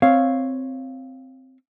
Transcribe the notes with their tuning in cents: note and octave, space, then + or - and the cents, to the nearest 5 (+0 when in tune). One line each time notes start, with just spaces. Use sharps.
C4 -5 C#5 +0 F5 +0